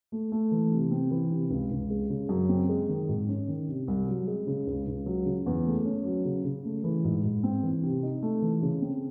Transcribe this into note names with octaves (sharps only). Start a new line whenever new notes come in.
A3
A3
E3
C3
C4
E3
C3
C#2
C#2
G#3
C#3
F#2
C4
G#3
D#3
G#2
C#4
D#3
C3
C2
F#3
G#3
C#3
C#2
C#2
F#3
C#3
E2
A3
C#4
F#3
C#3
C#3
A3
E3
G#2
G#2
C4
E3
C3
D#4
A3
E3
C#3
C4